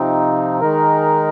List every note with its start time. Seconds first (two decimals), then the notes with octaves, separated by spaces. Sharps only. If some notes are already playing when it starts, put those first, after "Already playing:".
Already playing: C3 F3 C4 D#4
0.61 D#3 G#3 D#4 A#4